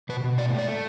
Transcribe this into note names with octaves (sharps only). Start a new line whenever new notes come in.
B2 B4
B2
A2 D5
A3 D5
A3